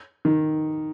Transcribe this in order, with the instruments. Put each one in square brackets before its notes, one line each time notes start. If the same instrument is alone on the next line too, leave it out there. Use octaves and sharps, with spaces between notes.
[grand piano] D#3